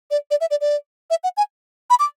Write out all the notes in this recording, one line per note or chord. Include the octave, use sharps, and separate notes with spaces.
D5
D5
E5
D5
D5
E5
F#5
G#5
B5
D6